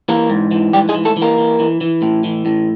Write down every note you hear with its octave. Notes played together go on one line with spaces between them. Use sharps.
E3 A#3 A#4
G#2
E3
G#2 G3 G4
G#3 G#4
E3
A3 A4
E3
A#3 A#4
E3
E3
E3
A2
E3
A2